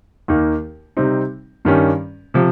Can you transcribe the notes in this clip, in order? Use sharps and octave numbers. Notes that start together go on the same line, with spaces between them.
D#2 D#3 A#3 D#4
C3 G3 C4 D#4
G2 D#3 G3 C#4
C3 F3